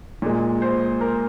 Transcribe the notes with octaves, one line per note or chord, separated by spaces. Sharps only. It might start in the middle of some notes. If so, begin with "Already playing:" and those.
A#2 G#3
C5
A#4